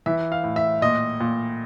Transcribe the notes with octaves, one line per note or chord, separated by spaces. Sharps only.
E3 E5
F5
A2
E5
A#2 D#5
A#2